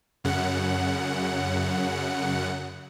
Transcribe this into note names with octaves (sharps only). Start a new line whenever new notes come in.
F#2 C#3 F#5